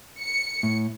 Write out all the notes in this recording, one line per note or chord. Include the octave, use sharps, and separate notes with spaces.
C#7
A2